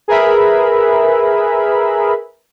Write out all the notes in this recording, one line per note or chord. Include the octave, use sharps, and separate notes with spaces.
G#4 A#4 B4 E5 B5